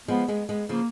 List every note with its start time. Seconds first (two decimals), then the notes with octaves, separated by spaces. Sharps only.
0.08 F3 G#3 B3
0.28 G#3 B3
0.49 G#3 B3
0.69 C#3 F3 A#3